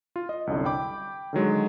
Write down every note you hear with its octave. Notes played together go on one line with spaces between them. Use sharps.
F4
D#5
C2 F#2 D3
G5 B5 D6
D3 D#3 F#3 G#3